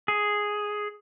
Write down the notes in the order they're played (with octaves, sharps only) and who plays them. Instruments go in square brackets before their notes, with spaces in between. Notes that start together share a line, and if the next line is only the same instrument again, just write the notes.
[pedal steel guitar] G#4